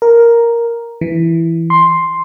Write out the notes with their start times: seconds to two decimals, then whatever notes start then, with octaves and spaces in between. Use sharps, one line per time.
0.02 A#4
1.01 E3
1.70 C6